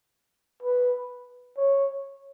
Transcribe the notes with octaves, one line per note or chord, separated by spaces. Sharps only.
B4
C#5